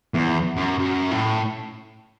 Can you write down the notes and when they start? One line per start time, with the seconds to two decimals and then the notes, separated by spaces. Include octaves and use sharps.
0.14 E2
0.56 F#2
0.79 F#2
1.11 A2